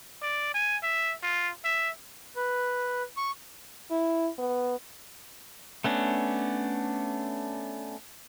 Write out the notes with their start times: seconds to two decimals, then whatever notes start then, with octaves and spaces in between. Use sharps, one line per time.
0.22 D5
0.54 G#5
0.83 E5
1.23 F4
1.65 E5
2.36 B4
3.17 C#6
3.90 E4
4.38 B3
5.84 A3 B3 C#4 D4